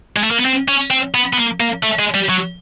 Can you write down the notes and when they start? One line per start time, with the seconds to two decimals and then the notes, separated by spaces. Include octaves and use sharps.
0.16 G#3
0.24 A3
0.31 A#3
0.39 B3
0.45 C4
0.68 C#4
0.91 C4
1.14 B3
1.33 B3
1.38 A#3
1.60 A#3
1.83 A3
1.99 G#3
2.14 G3
2.29 F#3